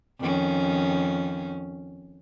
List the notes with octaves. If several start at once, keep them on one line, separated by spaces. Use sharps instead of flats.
F2 D#3 C#4